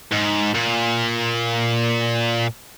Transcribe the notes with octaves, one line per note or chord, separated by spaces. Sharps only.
G#2
A#2